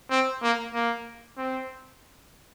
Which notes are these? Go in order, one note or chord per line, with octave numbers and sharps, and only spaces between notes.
C4
A#3
A#3
C4